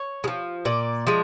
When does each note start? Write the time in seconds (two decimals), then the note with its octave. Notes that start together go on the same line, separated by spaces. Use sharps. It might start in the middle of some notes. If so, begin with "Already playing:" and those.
Already playing: C#5
0.24 G#3
0.28 F3
0.65 A#2 D5
1.07 F3 G#3